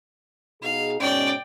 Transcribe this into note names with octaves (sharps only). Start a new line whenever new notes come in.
B2 D#4 G#4 F5
G#2 B2 C#4 D5 G5